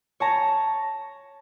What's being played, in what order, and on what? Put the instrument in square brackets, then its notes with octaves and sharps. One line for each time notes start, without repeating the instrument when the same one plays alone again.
[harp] C#5 A5 A#5